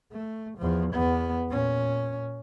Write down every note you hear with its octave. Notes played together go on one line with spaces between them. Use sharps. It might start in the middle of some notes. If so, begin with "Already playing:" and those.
A3
E2 F3
E2 B3
A#2 C#4